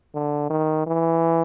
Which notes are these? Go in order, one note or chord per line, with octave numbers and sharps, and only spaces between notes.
D3
D#3
E3